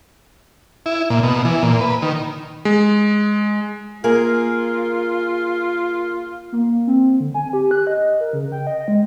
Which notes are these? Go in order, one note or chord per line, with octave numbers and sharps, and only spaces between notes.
E4
A#2
B2
E3
A#2
B4
D#3
G#3
A#3 F4 G#4 A#4
A#3
C4
D3
G#5
G4
F#6
D#5
A#4
C#3
G5
D#5
G#3